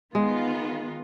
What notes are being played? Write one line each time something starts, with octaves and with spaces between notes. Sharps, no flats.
D#3 G#3 B3 F4